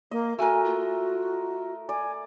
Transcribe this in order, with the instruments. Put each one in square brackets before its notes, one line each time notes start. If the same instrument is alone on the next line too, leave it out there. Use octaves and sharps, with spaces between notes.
[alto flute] A#3 [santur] D#5
[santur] A3 A#4 [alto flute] F#4 [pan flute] G#5
[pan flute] F4
[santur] D5 [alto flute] G#5